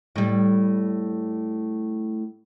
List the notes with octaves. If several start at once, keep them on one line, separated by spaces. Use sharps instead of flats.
A2 G3